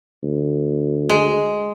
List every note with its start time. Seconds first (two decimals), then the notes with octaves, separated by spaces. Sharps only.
0.23 D2
1.09 G#3